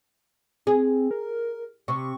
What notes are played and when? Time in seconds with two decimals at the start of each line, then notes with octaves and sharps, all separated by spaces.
0.67 C4 G#4
1.11 A#4
1.88 C3 C#6